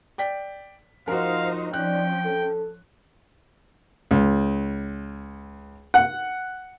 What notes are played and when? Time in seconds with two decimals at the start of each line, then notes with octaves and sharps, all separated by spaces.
0.18 D5 G5 B6
1.08 F3 D#4 F#4 A#4 C5 F5
1.73 F3 C#4 D#4 D5 G5 F#6
2.25 A4
4.11 C#2
5.94 F#5